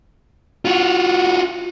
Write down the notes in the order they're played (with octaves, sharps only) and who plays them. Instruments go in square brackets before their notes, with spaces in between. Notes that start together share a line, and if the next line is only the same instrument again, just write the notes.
[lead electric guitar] F4 F#4